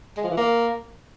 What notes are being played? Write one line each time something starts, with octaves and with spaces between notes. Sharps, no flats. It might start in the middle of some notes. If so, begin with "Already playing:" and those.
G#3
F3
E3
A#3